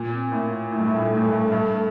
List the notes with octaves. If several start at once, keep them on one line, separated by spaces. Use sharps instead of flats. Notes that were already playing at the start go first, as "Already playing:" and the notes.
Already playing: A#2
C4
A2 A#3
A2 A3
G2
A2
A#2
A2
A2
G2
G2